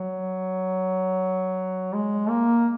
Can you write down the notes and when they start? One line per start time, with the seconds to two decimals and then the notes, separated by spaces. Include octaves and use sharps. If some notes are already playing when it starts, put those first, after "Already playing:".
Already playing: F#3
1.93 G#3
2.29 A#3